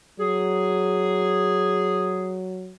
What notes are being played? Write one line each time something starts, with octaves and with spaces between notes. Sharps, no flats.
F#3 G#4